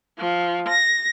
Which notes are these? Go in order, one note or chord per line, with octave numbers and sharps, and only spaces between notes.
F3
A#6